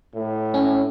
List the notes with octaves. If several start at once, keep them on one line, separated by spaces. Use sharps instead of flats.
A2
C#4